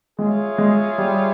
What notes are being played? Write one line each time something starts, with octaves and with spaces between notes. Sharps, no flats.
G#3 F4 G#4 C#5 E5
G#3
G3